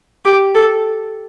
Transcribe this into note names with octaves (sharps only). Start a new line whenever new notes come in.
G4
A4